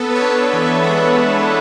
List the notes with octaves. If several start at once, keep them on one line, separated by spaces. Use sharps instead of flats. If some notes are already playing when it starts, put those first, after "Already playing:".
Already playing: B3 A4
B4
C#5
D4
C#5
E3
E5
G#3 F#5
B3